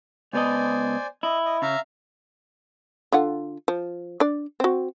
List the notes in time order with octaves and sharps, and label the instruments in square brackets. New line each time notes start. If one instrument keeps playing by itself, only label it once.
[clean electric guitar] C#2 B3 D#5 [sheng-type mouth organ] C5 D5 G#5
[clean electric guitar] E4 [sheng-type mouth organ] D#5
[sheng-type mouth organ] D#5
[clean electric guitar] C#3 [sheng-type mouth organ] E5 F5 A#5
[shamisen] D3 F4 F#5
F3
D4 D5
C4 F#4